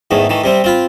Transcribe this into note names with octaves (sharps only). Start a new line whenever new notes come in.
E2 G#2 D#3 A3
D#3 E3 A3
C3 G3 C4
C4 F4 B5